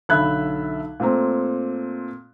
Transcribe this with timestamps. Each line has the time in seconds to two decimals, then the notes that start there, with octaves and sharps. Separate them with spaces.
0.09 B1 D3 E5 B5 F#6 G#6
1.00 A#2 A3 C4 A#5